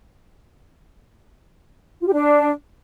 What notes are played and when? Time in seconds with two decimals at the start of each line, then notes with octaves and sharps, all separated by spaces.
2.01 F4
2.07 G4
2.12 D4